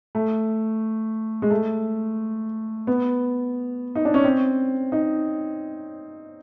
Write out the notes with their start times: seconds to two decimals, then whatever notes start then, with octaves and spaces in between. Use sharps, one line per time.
0.15 A3
1.42 G#3
1.50 A3
2.87 B3
3.95 D#4
4.05 D4
4.14 C#4
4.24 C4
4.92 D#4